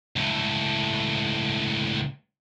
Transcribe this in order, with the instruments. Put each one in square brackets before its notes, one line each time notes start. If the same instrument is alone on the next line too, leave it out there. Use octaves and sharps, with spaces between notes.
[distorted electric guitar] C#2 A2